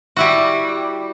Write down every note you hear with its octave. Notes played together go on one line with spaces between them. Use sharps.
G3 E4 F#4